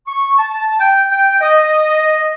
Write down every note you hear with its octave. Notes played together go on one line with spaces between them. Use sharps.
C#6
A5
G5
G5
D#5